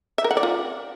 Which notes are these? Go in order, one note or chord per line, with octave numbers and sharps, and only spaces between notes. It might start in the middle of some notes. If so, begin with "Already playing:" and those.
E5
A#4
F#5
D5
F4